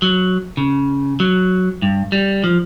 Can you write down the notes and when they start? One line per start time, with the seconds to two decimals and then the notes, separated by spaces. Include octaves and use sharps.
0.02 F#3
0.57 C#3
1.20 F#3
1.82 G2
2.12 G3
2.44 F3